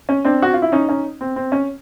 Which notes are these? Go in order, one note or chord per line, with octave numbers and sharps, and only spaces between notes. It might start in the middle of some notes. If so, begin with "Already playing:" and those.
C#4
C4 D4
F#4
F4
E4
C#4 D#4
C#4 D#4
C4
C4
C#4